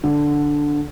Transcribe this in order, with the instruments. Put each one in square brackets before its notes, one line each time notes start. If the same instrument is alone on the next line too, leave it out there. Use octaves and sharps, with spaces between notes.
[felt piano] D3